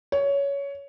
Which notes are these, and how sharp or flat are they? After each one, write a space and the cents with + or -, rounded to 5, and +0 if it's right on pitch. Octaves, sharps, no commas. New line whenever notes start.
C#5 +15